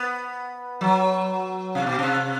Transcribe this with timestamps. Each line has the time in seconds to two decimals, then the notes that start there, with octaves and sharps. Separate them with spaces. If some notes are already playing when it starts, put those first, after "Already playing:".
Already playing: B3
0.81 F#3
1.75 C3
1.86 B2
1.99 C3